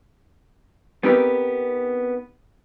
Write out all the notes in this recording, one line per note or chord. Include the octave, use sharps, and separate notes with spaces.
B3 C4 D#4 G4 A#4 B4